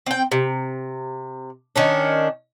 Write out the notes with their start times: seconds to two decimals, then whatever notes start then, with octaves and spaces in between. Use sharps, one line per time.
0.06 C4 G5
0.32 C3
1.76 D#3 C#4 D4